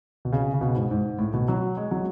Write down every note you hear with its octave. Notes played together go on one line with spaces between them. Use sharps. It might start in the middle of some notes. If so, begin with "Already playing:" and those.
B2
C#3
C#3
B2
G#2
G#2
A2
B2
F#3
G#3
F#3